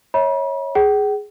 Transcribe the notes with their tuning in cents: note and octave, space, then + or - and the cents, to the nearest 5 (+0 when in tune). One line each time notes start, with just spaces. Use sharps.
C#5 -10 E5 -45 B5 -45
G#4 +0 G5 -45